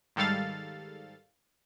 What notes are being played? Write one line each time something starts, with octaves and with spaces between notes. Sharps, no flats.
G#2 D#3 G3 A4 F5 A6